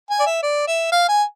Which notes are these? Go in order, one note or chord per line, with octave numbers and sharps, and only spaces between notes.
G#5
D5
E5
D5
E5
F5
G#5